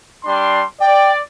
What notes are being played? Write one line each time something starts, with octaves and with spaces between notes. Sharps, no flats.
G3 D4 C6
D5 G5